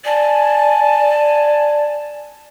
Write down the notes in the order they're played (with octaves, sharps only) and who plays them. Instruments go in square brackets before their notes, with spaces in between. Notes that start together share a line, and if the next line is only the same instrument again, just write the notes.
[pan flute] D5 [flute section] G#5 A5